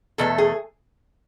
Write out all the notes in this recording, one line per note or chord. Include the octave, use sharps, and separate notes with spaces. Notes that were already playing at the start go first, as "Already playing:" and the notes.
E2 B2 A3 A4
G#4